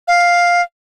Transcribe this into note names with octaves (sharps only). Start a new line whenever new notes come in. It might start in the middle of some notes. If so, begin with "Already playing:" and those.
F5